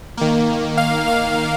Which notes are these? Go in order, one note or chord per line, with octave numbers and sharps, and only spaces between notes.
D#3 A#3
F5
F5